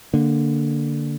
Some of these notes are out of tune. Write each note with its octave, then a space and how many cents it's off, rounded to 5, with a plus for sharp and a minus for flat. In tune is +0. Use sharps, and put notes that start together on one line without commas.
D3 +0 A#3 +0